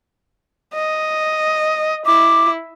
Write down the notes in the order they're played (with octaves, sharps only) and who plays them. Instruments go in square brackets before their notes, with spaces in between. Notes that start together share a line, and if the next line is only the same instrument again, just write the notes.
[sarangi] D#5
[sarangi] E4 [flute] D6